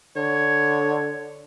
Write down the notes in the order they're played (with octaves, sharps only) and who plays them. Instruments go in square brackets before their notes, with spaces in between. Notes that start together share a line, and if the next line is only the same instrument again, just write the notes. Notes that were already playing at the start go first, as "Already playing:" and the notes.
[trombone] D3 [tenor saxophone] C#5